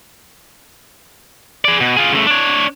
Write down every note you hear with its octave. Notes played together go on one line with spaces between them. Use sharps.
G#4 D5
B2
F4 G#4
C#3 A3
D4 C#5